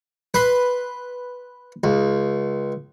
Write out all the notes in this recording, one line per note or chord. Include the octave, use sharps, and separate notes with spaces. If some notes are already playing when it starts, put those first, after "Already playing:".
B4 C6
C#2